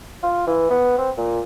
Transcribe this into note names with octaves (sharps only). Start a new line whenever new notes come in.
F4
E3
B3
C4
A#2